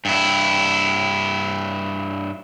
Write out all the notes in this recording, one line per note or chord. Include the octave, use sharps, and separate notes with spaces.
G2 E4